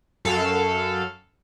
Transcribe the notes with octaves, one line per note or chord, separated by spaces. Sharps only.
F#2 A4 F5